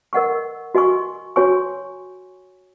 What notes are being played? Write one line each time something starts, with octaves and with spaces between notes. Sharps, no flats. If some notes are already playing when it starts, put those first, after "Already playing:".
A#4 D#5 F#5 C#6
F#4 D#5 G#5 C#6
F#4 C#5 G#5 C#6